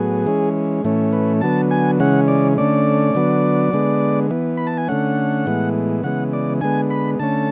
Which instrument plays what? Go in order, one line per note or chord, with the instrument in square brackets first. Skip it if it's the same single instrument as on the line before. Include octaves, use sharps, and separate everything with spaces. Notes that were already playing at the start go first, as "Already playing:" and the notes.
Already playing: [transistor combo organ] A2 F#3 B3 G#4
E3 G#3 C#4
A2 E3 A3 C#4
B4
D3 F#3 B3 A5
G#5
C#3 E3 G#3 C#4 F#5
D5
D3 A3 C#4 D5
D3 F#3 B3
D3 G#3 B3
E3 B3
B5
A5
G#5
D3 A3 C#4 F#5
A2 E3 G#3 B3
C#3 E3 G#3 B3 F#5
D5
D3 G#3 B3 G#5
B5
D3 A3 C#4 A5